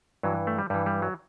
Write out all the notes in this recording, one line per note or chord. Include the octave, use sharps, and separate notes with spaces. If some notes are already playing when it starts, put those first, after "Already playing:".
G2 E3 F#3
A3
G3
G2 E3 G3
G3
F#3